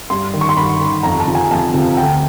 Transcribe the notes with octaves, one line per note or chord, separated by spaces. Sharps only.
G2 C6
D#3
C#6
C6
G2 B5
D#3
F2 A#5
A5
C3 F3
G#5
F2 A5
C3 F3
D2 G5